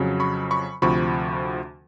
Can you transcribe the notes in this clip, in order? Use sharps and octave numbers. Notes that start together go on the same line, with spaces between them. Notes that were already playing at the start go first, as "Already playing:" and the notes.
Already playing: F2 C#3 F#3
B5 C#6
B5 C#6
D2 C3 F3 B5 C#6